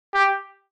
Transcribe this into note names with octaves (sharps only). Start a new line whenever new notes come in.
G4